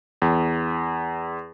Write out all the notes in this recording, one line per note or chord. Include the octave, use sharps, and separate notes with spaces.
E2